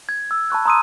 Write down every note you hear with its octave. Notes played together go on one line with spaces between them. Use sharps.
G#6
E6
A5 B5 C#6 F#6
A#5 C6 D#6 E6 D#7